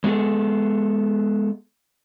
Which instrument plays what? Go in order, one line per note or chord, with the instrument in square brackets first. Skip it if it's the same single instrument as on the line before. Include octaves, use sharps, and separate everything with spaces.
[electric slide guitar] G#3 B3 F#4 G#4 A4